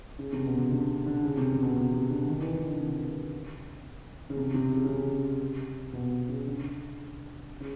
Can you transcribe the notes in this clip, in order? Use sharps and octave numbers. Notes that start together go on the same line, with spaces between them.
C#3
C3
B2
C3
D3
D3
C#3
C3
C3
B2
C3
C3
D3
D#3
E3
D#3
D3
C3
C#3
C3
C3
C#3
C#3
C3
B2
C#3
D3
C#3